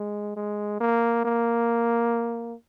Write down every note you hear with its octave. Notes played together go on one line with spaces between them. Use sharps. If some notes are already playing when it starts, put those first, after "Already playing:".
Already playing: G#3
G#3
A#3
A#3